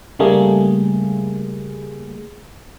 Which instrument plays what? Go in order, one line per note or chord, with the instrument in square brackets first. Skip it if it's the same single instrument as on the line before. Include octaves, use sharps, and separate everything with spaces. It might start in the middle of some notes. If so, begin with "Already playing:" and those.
[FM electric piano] C#3 G3 A3 A#3 G#4